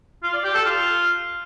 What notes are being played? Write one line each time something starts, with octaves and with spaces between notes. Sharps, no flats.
F4
D5
G4
A4
F4